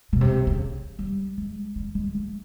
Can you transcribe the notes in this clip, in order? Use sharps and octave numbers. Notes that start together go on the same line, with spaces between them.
B2
C3
C#3
G3
G#3
G3
G#3
A3